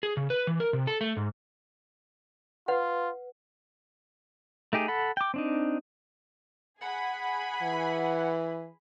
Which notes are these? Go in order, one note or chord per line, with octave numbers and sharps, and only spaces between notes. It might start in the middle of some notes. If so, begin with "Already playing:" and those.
G#4
C#3
B4
E3
A#4
C3
A4
A3
G#2
F4 B4 F#5
A3 D#4 G4 G#4
A4 F#5 B5
G5 D6
C4 D4 D#4
G#4 F#5 G#5 B5
E3